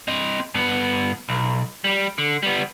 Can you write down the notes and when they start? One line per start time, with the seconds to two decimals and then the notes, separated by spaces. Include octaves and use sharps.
0.08 C4 D#5
0.54 G2 B3
1.29 B1
1.84 G3
2.18 D3
2.43 G3 B3